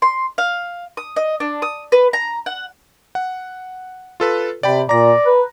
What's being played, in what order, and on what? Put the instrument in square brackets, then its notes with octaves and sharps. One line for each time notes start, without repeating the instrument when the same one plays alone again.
[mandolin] C6
F5
D#6
D#5
D4
D#6
B4
A#5
F#5
[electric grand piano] F#5
F4 A4 B4
[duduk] C3 [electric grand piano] D5 G5 B5
[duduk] A#2 [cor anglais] D5 [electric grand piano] A#5 A#6
[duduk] B4